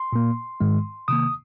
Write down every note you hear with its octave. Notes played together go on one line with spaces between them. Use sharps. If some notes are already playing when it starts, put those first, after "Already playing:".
Already playing: C6
A#2 A#3
G#2 D#3 G#3
C3 D#3 A#3 D#6